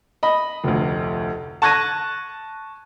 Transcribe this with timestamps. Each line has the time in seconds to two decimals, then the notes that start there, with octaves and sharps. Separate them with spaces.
0.23 D#5 B5
0.64 F1 D2
1.62 A5 C#6 F#6 G#6 A#6 D#7